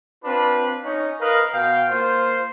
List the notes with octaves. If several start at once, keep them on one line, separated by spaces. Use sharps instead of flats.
C4 D4 F4 B4
C#4 D#4
A#4 B4 D#5 F5
B2 F5 G5
A#3 F4 C5